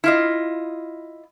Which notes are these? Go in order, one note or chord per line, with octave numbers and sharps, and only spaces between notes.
E4 F4 D#5